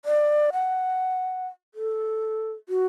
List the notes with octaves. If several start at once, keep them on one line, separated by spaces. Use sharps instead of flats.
D5
F#5
A4
F#4